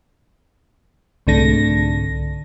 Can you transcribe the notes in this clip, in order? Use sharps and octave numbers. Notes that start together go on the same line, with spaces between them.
C2 G#2 D3 A3 A#6